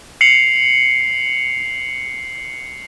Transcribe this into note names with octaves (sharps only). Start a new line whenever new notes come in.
C7 C#7 F7 F#7